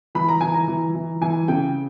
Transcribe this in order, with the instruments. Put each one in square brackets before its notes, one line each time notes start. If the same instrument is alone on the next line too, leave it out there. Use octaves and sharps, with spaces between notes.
[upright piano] E3 B5
A#5
E3 G#5
A#5
E3
E3
E3 G#5
C#3 G5